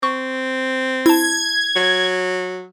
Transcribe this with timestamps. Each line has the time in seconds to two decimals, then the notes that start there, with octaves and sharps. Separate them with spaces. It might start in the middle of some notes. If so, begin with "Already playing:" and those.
0.03 C4 C#6
1.06 E4 A5 G#6
1.76 F#3